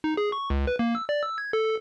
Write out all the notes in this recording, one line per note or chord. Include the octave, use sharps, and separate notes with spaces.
D#4
G#4
C#6
C#2
B4
A#3
E6
D5
E6
G#6
A4